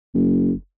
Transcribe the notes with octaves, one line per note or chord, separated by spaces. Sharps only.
F#1